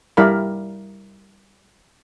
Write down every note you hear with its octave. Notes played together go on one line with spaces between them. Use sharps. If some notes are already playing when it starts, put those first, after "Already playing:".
G3 E4 A#4 D5 F5 B5